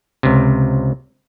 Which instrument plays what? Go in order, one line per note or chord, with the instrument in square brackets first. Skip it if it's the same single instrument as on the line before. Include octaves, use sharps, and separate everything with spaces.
[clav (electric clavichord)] C#2 C3